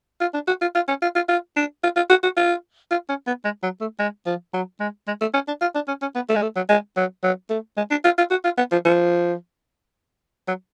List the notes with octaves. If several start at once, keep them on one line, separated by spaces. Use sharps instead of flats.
F4
D4
F#4
F4
F4
C#4
F4
F4
F4
D4
F4
F4
F#4
F#4
F4
F4
C#4
B3
G#3
F#3
A3
G#3
F3
F#3
G#3
G#3
A3
C#4
D4
F4
D4
C#4
C#4
B3
A3
G#3
A3
F#3
G#3
F#3
F#3
A3
G#3
D4
F4
F4
F#4
F4
B3
F3
F3
F#3